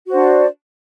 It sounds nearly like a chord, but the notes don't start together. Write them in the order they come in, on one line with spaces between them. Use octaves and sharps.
F#4 C5 D4 D5